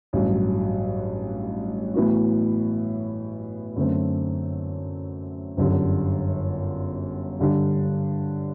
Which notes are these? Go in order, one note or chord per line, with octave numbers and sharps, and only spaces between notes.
A1 G2 F#3
A2 E3 B3 F#4
F#2 D3 A3 C4
G1 F#2 D3 G3
G2 D3 G3 D4